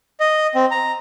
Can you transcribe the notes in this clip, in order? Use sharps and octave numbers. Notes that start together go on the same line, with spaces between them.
D#5
C4
A#5